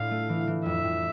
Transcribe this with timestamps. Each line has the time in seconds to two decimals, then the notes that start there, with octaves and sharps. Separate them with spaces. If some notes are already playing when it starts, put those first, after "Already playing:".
Already playing: A2 D4 F4 F5
0.11 A3
0.29 E3
0.47 E3
0.65 F2 E5
0.84 F2